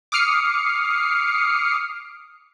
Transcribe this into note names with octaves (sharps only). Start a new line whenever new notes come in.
D6 D#6 F6 C7 C#7